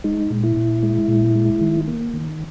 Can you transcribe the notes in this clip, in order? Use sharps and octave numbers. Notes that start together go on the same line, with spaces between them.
G#3 D#4
A#2
E4
A#2
G#3
A#2
G#3
D#3
A#3
D#3